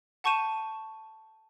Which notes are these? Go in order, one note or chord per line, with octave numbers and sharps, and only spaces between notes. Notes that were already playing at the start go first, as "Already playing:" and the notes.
F#5 A5 C#6 G6 D#7 E7